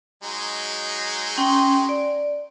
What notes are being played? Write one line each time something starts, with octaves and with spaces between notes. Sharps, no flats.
F#3 G#3 D#4
C#4 G5 C6
D5